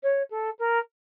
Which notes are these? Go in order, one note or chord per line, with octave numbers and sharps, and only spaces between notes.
C#5
A4
A#4